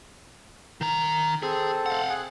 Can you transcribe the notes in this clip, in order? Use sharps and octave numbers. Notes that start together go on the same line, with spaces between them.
D#3 A#5
C4 G#4 A4
F5 F#5
G#4 F#6